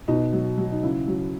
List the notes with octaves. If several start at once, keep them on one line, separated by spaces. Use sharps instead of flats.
B2 D#4
F#3
F#3
D#4
C#3 E4
F#3